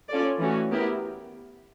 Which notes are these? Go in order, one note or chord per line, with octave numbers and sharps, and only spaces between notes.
C#4 F4 A4 D5
E3 A3 C#4 F#4
B3 E4 G4 A#4